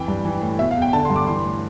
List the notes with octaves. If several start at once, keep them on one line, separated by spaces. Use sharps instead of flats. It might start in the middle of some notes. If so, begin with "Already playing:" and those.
Already playing: F2 E3 G5
G2
E3
A2
B2 E5
F5
E2
G5
D3 A5
C6
G2
D6
E3 C6
A2